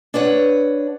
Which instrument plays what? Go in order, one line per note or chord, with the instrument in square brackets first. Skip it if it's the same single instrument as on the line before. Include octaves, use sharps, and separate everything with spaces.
[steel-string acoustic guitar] D4 B4 C#5 F#5